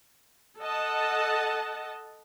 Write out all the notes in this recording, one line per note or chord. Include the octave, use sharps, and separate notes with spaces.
A4 D#5 F#5 A5